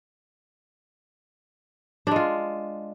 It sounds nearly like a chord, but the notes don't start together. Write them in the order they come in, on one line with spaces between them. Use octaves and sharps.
D4 G#3 F4